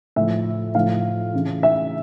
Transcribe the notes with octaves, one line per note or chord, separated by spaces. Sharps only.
A2 F3 E5
A2 F3 F5
C#3 E3
E5